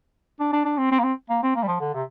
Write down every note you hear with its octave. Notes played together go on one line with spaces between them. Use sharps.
D4
D4
D4
C4
C4
A#3
C4
A#3
C4
A#3
G3
F3
D3
C3